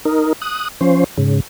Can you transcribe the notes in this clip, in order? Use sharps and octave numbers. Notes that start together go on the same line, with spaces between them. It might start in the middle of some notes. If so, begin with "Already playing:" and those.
D#4 A#4
D#6 F#6
F3 C#4 C5
G#2 C#3